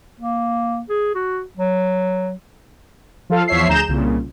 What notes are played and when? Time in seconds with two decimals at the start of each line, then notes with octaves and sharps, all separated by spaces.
0.20 A#3
0.89 G#4
1.15 F#4
1.57 F#3
3.30 F3 F4 A4 F5
3.48 E2 F3 C#5 E5 C7
3.68 D2 G#4 A#5 G6 E7
3.88 C2 A#2 C#3